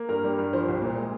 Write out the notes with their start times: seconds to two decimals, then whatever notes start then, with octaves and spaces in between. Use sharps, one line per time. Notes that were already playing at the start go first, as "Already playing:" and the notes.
Already playing: A#3
0.09 G2 A#4
0.24 G3
0.39 G2
0.53 F3 C5
0.68 C2
0.82 A#2
0.97 G#3